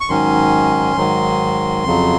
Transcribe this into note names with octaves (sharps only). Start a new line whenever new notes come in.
C#6
G#2 D#3 F#3 C#4 C6
G#2 D#3 F#3
F2 C#3 F#3